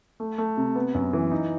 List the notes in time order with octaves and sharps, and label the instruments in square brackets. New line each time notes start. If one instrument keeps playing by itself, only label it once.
[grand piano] A3
A3
C3
B3
F#2
E3
D#4